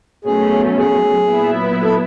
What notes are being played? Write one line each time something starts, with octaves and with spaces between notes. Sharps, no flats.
B2 F#3 A3 C#4 G#4
G#4
A#2 F#3 B3 E4
A4